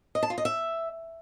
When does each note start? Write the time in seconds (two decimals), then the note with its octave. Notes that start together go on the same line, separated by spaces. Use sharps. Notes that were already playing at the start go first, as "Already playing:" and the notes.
0.15 D#5
0.23 A5
0.30 F4
0.38 D#5
0.45 E5